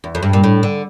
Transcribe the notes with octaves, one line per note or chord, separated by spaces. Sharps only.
E2
F2
G2
A#2
A2
D3